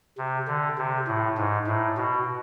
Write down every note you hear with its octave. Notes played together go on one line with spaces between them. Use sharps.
C3
D3
C3
A2
G#2
A2
B2